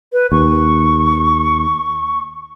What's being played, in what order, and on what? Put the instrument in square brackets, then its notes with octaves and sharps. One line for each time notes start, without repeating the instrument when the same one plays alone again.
[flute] B4
[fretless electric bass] D#2 [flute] C#6